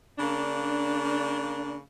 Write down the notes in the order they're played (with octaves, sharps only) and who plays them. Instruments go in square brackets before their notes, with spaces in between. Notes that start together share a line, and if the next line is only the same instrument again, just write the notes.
[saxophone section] C#3 A#3 D4